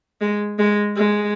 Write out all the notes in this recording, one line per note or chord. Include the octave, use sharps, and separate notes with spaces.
G#3
G#3
G#3